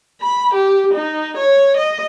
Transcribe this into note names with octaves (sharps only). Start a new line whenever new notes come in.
B5
G4
D#4
C#5
D#5